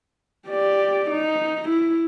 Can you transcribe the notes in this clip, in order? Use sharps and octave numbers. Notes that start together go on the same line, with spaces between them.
G4 D5
D#4
E4